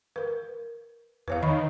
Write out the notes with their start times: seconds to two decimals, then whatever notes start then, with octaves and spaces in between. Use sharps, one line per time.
0.16 A#4 B4
1.28 E2 B4 C#5 F5
1.42 D#3 D#5 B5 C#6